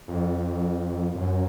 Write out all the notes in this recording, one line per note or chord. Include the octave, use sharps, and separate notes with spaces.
F2
F#2